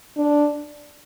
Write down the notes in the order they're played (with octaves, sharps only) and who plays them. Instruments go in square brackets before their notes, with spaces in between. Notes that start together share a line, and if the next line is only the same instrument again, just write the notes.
[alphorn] D4